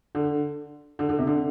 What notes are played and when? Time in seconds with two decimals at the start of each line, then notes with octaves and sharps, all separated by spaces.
0.15 D3
0.99 D3
1.09 D3
1.19 C3
1.27 D3